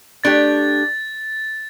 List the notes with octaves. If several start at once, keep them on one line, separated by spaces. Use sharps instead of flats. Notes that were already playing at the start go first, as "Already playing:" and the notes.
A3 D4 G4 A6